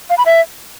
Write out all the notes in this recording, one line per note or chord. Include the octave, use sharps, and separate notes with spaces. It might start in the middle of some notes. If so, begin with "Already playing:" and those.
F5
B5
E5